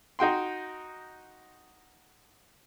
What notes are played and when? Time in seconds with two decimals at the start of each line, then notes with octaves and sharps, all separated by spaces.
0.19 D#4 F#4 G5 C6